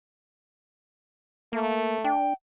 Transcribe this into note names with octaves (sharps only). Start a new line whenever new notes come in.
A3 A#3
D4 G5